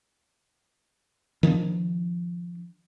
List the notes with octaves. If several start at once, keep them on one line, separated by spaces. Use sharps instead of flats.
D#3 F3 B3 D4